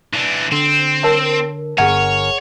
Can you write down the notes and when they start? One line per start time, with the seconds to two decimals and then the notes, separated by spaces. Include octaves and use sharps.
0.14 E3 D4
0.52 D3 C4
1.03 A#4 C#5 A5
1.78 G1 G#4 A#4 C#5 F#5 G#5